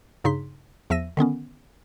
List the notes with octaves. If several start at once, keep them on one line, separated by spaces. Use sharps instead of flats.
G2 C#3 D#4 C6 B6
E2 F3 E5 E6 A#6 D#7
D3 D#3 B3 C#4